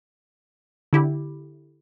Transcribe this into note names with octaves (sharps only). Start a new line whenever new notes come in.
D3 E4 G4